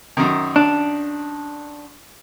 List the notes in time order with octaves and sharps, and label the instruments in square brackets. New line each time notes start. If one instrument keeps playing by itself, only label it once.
[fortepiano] F#2 D#3
[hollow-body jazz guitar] D4